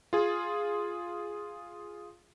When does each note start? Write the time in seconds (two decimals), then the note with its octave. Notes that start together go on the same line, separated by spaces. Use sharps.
0.13 F4 G#4